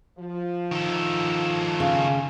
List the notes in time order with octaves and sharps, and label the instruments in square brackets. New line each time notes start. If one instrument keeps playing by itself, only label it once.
[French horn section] F3
[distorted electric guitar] D#3 A4
[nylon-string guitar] C#3